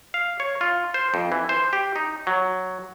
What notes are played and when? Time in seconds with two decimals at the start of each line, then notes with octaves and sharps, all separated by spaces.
0.14 F5
0.40 C#5
0.61 F4
0.94 C5
1.14 F2
1.32 E3
1.49 C5
1.73 G4
1.96 D#4
2.27 F#3